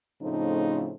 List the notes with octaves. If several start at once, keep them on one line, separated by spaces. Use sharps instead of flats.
A2 C#3 F3 A3 C4 D#4